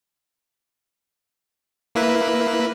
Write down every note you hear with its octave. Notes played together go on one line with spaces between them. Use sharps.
A#3 E4 B4